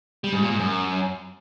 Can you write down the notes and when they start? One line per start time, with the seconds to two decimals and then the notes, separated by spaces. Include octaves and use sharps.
0.24 G3
0.33 G#2
0.41 A#2
0.50 G#2
0.59 F#2